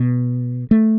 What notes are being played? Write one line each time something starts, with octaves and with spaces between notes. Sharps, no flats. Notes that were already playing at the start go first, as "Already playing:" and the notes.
Already playing: B2
A3